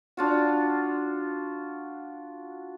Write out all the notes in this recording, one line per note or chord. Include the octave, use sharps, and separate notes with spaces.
D4 F4 F#4